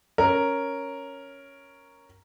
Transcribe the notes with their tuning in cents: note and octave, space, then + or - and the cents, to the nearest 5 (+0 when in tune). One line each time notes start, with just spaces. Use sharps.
C#4 +0 A#4 +0